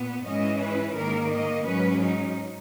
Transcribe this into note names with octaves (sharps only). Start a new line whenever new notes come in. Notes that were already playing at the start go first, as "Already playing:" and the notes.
Already playing: A#2 B3
G#2 E3 G#3 C#4 D#5
B4
G#2 D#3 A#3 A#4
D#5
G#2 F#3 C#4 B4
D#4